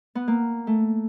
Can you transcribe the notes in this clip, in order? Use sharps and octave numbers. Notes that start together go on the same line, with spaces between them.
B3
A#3
A3